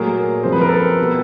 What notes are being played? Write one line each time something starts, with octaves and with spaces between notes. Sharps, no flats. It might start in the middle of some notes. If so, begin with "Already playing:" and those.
Already playing: A#2 F#3 A3 G#4 A#4
C3 F3 G#3 C5
B4
A#4
A4 B4
B2 G3 B3